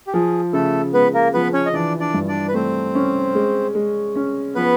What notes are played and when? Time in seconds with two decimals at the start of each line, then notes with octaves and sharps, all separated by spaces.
0.07 G4
0.13 F3 G#4
0.53 C#3 A3 A4
0.93 G#3 B3 B4
1.14 A#3 A#4
1.34 F3 B3 B4
1.53 C#4 C#5
1.66 D#5
1.73 E3 D4 D5
2.00 D4 D5
2.14 G2
2.28 D4 D5
2.48 B4
2.54 A3 C4 C5
2.95 C#4
3.35 G#3
3.75 G#3
4.16 C#4
4.55 F3 B3 B4